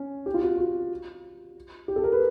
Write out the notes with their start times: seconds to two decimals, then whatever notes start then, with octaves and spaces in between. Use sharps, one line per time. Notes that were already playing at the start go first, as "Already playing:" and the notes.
Already playing: C#4
0.26 G4
0.34 F4
0.43 F#4
0.58 F#4
1.88 G4
1.96 A4
2.04 A#4
2.12 B4